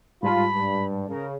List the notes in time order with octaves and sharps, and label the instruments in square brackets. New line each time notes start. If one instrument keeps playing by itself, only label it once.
[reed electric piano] G#2 G3 A5 [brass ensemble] F4 [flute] B5
[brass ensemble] G2
[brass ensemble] C#3 [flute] A#4